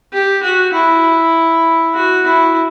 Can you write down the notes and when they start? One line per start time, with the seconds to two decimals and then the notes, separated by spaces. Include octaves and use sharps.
0.13 G4
0.43 F#4
0.73 E4
1.95 F#4
2.25 E4